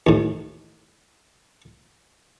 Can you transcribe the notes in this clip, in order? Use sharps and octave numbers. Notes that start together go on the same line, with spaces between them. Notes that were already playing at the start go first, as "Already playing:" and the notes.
D#2 A2